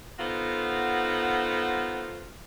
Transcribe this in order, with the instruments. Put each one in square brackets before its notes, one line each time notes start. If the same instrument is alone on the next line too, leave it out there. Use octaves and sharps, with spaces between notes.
[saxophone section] B3 D#4 F4 F#4 A4 C5